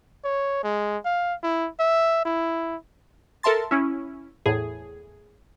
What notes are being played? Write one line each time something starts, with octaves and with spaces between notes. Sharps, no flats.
C#5
G#3
F5
E4
E5
E4
A4 A#4 E5 A5 C6 A6
C#4 E4
E2 A2 G#4